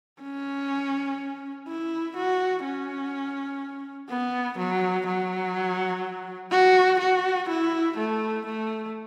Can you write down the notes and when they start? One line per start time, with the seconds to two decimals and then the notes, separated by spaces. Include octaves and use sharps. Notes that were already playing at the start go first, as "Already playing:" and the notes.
0.22 C#4
1.68 E4
2.16 F#4
2.64 C#4
4.10 B3
4.58 F#3
5.06 F#3
6.52 F#4
7.00 F#4
7.49 E4
7.97 A3
8.45 A3